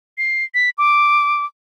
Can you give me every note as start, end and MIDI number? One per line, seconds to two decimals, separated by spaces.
0.18 0.44 96
0.54 0.70 95
0.78 1.45 86